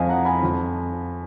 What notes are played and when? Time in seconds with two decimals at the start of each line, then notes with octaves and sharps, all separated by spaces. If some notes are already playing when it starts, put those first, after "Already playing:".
Already playing: F2 F3 D#5 F5 G#5
0.09 F#5 A#5
0.25 G#5 B5
0.42 F2 F3